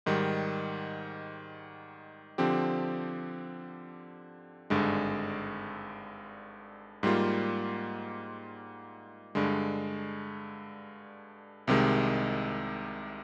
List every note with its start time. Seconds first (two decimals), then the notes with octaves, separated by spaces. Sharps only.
0.06 G#2 D#3 G3
2.38 D3 F3 C4 G4
4.70 G#1 G2 D3 G#3
7.03 G#2 G3 A#3 F4
9.35 G2 D3 G#3
11.67 C2 C3 D#3 G#3